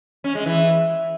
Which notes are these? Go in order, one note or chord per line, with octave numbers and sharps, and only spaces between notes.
C#4
G#3
E3